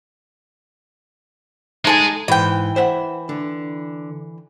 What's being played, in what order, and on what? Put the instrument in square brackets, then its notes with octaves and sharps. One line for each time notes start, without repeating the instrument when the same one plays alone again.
[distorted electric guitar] G#3 G#4 [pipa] D#4 A4 G#5
[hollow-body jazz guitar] G#2 [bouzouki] E3 G5
[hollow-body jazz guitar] C5 E5 F#5
D3